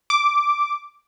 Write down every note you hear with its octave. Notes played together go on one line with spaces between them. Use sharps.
D6